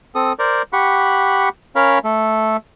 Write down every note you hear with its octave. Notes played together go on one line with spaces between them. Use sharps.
C4 A4 D#6
A#4 C5 D5
G4 F#5 B5 C#6
C#4 A#4 C#5 F5 B5
A3 A4